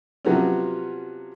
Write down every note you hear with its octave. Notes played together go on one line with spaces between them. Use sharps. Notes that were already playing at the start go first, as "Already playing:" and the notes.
C3 F3 F#3 B3 C#4